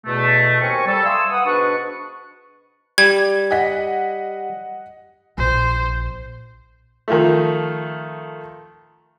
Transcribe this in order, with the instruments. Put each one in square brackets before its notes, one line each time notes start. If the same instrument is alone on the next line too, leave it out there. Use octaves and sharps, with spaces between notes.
[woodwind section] E2 B2 A3
D#2 C4 A#4 G#5 C#6
G3 A4
E5 F5 G#5 C6 D#6 E6
B4 F#5 D#6
G#2 B2 D4 B4 C#6
[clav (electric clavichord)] G3 [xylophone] G#6
[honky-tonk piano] D#5 F#5 B6
[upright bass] A#1 [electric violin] C5
[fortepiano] D#3 F3 A3